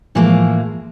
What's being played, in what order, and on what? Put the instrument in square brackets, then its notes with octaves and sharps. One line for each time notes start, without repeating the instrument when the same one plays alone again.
[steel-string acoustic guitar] A2 E3 F3 G#3 A#3